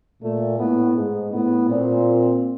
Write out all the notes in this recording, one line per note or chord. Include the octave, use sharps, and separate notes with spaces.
A#2 A3
A2 B3
G#2
A2 B3
A#2 C4